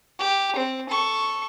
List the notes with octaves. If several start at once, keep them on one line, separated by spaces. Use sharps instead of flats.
G4
C4
A4 C#6